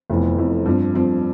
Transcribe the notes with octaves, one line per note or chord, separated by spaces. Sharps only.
F1 F2 E3 B3
F1 F2 E3 B3
G2 F3 C4
G2 F3 C4